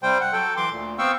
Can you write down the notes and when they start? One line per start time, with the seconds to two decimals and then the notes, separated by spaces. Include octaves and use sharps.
0.03 C3 G3 C5 G5
0.21 F#5
0.33 F#3 A4 G5
0.57 E3 C6 D6
0.71 D2 A#2
0.98 B3 C4 F5 G5 C#6 E6